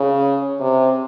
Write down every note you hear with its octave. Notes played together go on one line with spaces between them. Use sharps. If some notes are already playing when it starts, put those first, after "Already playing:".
Already playing: C#3
C3